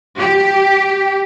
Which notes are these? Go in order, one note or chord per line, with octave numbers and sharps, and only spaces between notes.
G4